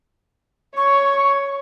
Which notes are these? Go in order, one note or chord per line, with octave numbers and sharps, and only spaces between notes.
C#5 C#6